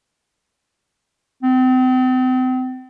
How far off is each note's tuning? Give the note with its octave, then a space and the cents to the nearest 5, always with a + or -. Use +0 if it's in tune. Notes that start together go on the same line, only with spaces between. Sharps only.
C4 -40